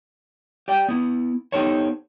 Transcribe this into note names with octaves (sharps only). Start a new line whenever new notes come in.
G4 D5 G5
B3 E4
B3 D#4 G4 A4 C5 C#5